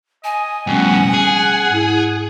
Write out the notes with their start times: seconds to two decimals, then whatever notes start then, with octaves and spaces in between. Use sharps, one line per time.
0.24 D#5 G#5
0.67 F2 B2 G3 A3 C#4 F#5
1.14 G#4
1.70 G#2 E4